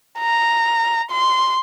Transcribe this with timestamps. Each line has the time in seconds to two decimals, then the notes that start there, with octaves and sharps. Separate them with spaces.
0.19 A#5
1.11 C6